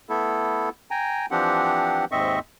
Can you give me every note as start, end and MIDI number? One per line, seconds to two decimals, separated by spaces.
0.09 0.69 57
0.09 0.69 59
0.09 0.69 64
0.09 0.69 69
0.91 1.26 79
0.91 1.26 80
0.91 1.26 82
1.31 2.05 52
1.31 2.05 53
1.31 2.05 60
1.31 2.05 62
1.31 2.05 67
1.31 2.05 78
2.12 2.39 39
2.12 2.39 44
2.12 2.39 60
2.12 2.39 75
2.12 2.39 76
2.12 2.39 85